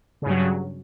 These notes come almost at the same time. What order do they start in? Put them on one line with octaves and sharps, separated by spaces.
C#3 G2 F#3